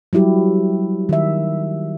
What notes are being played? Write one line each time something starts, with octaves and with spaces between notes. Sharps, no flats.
F#3 G3 E4 G4
D#3 E5